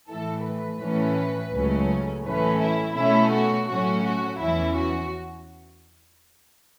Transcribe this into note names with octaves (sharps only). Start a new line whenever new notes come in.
A2 E3 A3 A4
B4
A2 E3 C#4
C#2 C#3 F#3 A3 C#4
A2 E3 A3 C#4 B4
E4
B2 A3 C#4 E4
F#4
A2 F#3 A3 C#4 F#4
F#4
E2 E3 C#4 E4
F#4